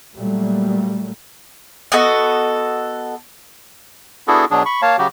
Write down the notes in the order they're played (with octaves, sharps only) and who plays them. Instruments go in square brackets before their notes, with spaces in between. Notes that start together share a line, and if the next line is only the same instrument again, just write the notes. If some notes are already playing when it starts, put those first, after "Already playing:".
[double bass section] A#2 F#3 G3 A3 A#3
[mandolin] B3 F#4 A4 D#5
[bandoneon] B3 D4 E4 F#4 G#4 A4
B2 F#3 D4 G#4
B5 C#6
A#3 C#5 F5 A5
C#3 F#3 F#4 G4